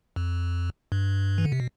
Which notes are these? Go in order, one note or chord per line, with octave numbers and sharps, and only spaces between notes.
F2
G2
E3
D3
C3
B2